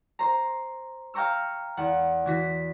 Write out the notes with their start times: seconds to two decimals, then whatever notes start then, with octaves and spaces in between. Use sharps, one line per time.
0.19 C5 A#5
1.14 F5 G5 A#5 C#6 E6
1.77 E2 F#5
2.26 E3 F#4 B6